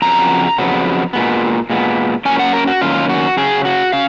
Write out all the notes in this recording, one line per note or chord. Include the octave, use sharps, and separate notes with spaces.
F2 C#3 F#3 B3 A#5
F2 C#3 F#3 B3
A#2 G#3 B3
A#2 G#3 B3
F#2 D#3 A#3 C#4 G#5
F#5
A#4
F#4
F#2 D#3 A#3 C#4 F4
F#4
C#3 F#3 C#4 G#4
F#4
C#4 F5